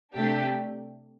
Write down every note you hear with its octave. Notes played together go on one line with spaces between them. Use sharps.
C3 A3 D4 G4